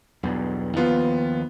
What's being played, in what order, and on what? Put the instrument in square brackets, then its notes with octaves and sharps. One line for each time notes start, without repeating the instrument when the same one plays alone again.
[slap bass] B1 E2 G2
[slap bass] D#2 F3 [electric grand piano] B3 F4